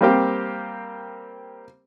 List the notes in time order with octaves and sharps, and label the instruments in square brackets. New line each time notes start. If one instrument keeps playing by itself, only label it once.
[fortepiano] G3 A#3 C4 G4